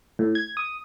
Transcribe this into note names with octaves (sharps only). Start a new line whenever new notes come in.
A2
G#6
D#6